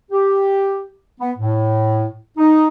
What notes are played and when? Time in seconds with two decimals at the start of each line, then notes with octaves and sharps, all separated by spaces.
0.11 G4
1.20 B3
1.38 A2
2.38 D#4